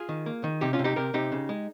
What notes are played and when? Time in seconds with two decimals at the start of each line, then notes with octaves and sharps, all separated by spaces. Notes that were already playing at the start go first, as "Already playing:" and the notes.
Already playing: F4 G#4
0.09 D#3
0.26 A#3
0.44 D#3
0.61 C3 D#4 G4
0.73 C#4 F4
0.79 C3
0.84 D#4 G4
0.96 C3 G4 A#4
1.14 C3 D#4 G4
1.32 C#3
1.49 G#3